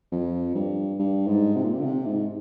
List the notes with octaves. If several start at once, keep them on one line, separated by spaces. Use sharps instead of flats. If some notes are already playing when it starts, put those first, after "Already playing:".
F2
G2
G2
G#2
C3
A#2
C3
D3
C3
G#2